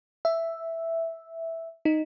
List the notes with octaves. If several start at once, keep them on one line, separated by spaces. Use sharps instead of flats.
E5
D#4